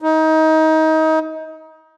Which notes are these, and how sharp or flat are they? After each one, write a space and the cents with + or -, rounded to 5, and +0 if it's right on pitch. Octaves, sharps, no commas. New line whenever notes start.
D#4 +25